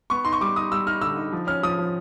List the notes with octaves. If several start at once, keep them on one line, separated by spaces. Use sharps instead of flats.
B3 C#6
D#4 C6
C#6
G3 D6
D#4 D#6
G3 E6
D#4 F6
D3 E6
D#4
F3
C#4 F6
F3 D#6
F3